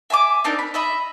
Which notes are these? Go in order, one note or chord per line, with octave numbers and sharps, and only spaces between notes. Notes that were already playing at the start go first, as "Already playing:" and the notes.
E5 G#5 C6 D6
C4 D4 D#4 A#4
B5
D#5 E5 B5